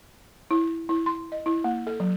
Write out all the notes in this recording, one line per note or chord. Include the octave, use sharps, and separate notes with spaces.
E4
E4
C6
D#5
E4
A#3
A4
F#3